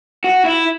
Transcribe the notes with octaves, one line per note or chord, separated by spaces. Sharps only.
F#4
E4